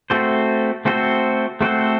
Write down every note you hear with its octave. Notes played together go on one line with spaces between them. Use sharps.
A3 C4 F#4 A4 C5
A3 C4 F#4 A4 C5
A3 C4 F#4 A4 C5